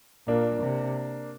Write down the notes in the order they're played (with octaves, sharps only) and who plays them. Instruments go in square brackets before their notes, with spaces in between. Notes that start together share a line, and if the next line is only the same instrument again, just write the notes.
[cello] A#2 [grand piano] A#3 D4
[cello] C3